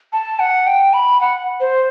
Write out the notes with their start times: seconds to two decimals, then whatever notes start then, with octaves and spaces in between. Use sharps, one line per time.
0.13 A5
0.40 F#5
0.67 G5
0.93 B5
1.21 F#5
1.60 C5